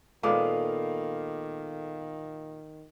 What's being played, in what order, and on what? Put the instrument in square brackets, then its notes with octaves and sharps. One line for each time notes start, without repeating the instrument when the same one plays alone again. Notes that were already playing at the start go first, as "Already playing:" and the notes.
[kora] A#2 G#3 B3 [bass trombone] D#3 [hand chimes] A4 [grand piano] F5 D6